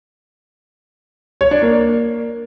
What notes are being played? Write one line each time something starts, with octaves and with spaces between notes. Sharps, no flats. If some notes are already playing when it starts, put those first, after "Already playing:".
C#5
D4
A#3